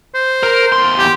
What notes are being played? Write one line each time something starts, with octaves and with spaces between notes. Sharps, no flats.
C5
A#4
E2 C6
G4